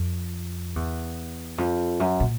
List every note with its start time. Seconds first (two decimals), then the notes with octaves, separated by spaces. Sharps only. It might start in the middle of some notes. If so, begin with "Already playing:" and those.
Already playing: F2
0.76 E2
1.58 F2
2.00 F#2
2.20 A#2